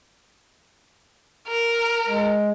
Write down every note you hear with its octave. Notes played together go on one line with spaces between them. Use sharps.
A#4
G#3